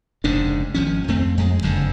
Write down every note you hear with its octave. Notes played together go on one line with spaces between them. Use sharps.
F1 G#2 C#3 D4
G#1 F3 C#4
F2 A3 C4
F2 G#3
F#1 F2 D3